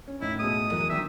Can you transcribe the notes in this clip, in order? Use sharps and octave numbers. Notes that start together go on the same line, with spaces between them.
C#4
D#2 A2 D#4 E4
B2 G#3 A3 D#6
E3 F#3 A#4
D#3 D4 E5